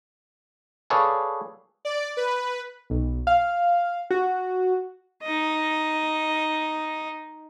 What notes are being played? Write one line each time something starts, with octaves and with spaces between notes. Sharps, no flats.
G#4 A4 B4 C#5 D5 F5
D5
B4
B1
F5
F#4
D#4 D#5